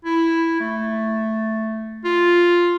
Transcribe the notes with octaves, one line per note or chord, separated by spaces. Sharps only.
E4
A3
F4